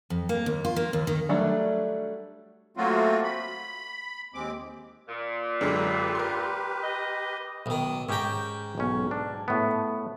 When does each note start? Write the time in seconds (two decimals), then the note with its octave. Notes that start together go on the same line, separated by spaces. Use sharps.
0.10 F2
0.29 A#3
0.46 D#2
0.65 F4
0.76 A#3
0.93 D#2
1.07 D#3
1.29 F#3 G3 A3 D4
2.77 F#3 A3 A#3 C4 F4 F#4
3.24 B5
4.34 D#2 G#3 C4 D6
5.08 A#2
5.61 F#2 D3 G#3 G4 B4
6.15 A#4 C6
6.83 D#5
7.66 B1 D#3
8.09 G#2 C#4 G4 G5 A#5
8.78 B1 C#4
9.11 D4
9.48 A2 B3